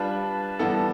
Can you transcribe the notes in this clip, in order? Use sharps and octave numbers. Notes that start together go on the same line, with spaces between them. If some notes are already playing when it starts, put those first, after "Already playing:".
Already playing: G3 D4 F4 B4 A5
G2 E3 B3 E4 A4